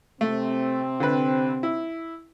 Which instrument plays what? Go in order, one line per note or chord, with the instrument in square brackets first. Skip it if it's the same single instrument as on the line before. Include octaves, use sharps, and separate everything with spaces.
[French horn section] C3 C4 [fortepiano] A3
[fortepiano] D3 B4
E4